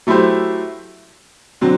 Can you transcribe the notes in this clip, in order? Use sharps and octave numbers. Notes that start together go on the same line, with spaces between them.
F#3 A3 E4 G4 C5
D3 F#3 C4